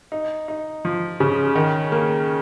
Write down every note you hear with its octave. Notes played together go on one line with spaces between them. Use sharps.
D#4
D#4
F3
C#3
D#3
A#3